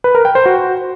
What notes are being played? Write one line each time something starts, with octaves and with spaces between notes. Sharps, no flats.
B4
A#4
G5
C5
F#4